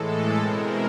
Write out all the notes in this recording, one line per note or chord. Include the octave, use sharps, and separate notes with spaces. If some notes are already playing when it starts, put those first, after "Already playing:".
Already playing: A2 E3 G#3 A4
B2 G#3 C4 E4 A#4